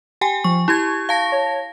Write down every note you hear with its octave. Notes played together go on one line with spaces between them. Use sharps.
G4 G5 G#5
F3 C#6
E4 G4 C#6 G#6
F5 A5 A#6
C#5